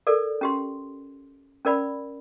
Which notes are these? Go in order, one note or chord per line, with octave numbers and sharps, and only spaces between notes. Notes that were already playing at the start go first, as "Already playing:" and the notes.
A4 A#4 D5
C#4 G4 C6
C#4 A#4 D5 B5